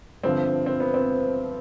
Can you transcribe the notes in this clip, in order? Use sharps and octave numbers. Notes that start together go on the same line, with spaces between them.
G1 G2 D3 F3 C4
C4
B3
C4